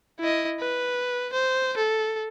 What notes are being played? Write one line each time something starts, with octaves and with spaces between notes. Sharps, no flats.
E4 D#5
B4
C5
A4